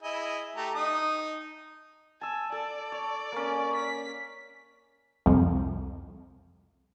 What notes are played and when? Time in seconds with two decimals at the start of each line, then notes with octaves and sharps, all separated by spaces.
0.03 E4 G#4 D#5
0.56 A3 G4 A#5
0.75 D#4 D#6
2.21 G#5 A5 E6
2.52 A4 D5
2.92 C#5
3.32 A#3 C#4
3.75 B6
5.26 C2 F2